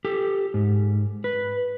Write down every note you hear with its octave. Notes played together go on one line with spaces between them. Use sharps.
G4 A4
G#2
B4